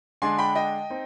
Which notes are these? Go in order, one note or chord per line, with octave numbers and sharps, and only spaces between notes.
D3 G#3 D4 G#5 C6
G5 B5
D#5 G5
C4 D#4